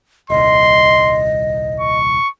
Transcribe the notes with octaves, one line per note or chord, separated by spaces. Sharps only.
D#1 C2 D#5 C6
C#6